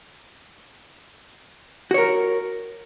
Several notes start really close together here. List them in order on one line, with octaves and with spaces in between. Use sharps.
F#4 C#5 A#4